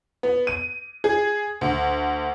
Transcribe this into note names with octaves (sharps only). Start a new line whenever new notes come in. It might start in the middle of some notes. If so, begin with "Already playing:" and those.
B3
D#7
G#4
D2